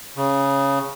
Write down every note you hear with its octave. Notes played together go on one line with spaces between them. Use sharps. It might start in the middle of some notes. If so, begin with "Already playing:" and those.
C#3